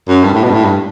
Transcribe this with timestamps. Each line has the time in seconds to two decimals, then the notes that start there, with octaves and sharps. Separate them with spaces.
0.09 F#2
0.24 G2
0.34 A2
0.44 B2
0.50 G2
0.54 A2
0.65 G2